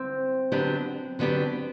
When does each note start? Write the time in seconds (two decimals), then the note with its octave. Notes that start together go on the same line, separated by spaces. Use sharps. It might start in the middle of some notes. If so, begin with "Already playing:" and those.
Already playing: C4
0.52 D3 F#3 B3 D4 G4
1.19 D3 F#3 B3 D4 G4